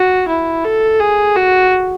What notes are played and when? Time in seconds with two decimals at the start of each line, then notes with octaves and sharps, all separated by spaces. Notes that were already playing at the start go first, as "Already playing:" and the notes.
Already playing: F#4
0.28 E4
0.64 A4
1.00 G#4
1.36 F#4